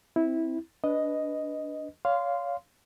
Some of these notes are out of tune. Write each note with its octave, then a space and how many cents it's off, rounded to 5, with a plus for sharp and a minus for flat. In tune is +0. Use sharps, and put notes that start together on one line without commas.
C4 +0 E4 -15
D4 -15 B4 +0 D#5 +0
C#5 +30 F5 +0 C6 -15